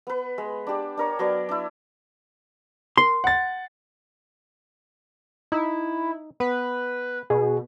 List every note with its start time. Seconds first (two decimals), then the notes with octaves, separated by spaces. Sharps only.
0.07 B3 B4
0.38 G#3
0.67 D4 G4
0.97 D4 A#4 C#5
1.19 F#3 B3 D5
1.49 D4 E4
2.98 A#4 C6
3.24 F#5 A6
5.52 D#4 E4
6.40 B3 B4
7.30 B2 G#4